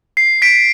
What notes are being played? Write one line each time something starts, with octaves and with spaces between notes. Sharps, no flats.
C7
B6 D7